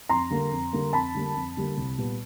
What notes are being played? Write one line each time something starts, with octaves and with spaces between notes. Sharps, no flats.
F2 A#5 C6
D3 G3 A#3
F2
D3 G3 A#3
F2 A5 B5
D3 G3 A#3
F2
D3 G3 A#3
C2
A#2 G3 B3